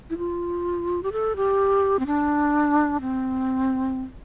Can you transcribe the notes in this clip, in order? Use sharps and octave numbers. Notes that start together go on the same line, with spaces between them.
E4
F4
G4
A4
G4
C4
D4
C4